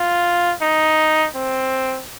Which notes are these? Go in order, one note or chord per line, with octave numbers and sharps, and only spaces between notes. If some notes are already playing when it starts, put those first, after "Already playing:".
Already playing: F4
D#4
C4